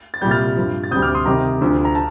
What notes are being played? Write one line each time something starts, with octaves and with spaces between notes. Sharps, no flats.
A6
C2 A#2 G3 G6
F6 A6
G2 F3
A6
D2 C3 G3 D#6 G6
D6 F6
C6 D#6
C2 C3 D#3 A#5 D6
D2 D3 F3
A#5
A5